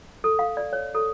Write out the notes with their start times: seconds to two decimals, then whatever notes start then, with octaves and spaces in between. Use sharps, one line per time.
0.24 A4
0.39 F5
0.57 D5
0.73 C#5
0.95 A4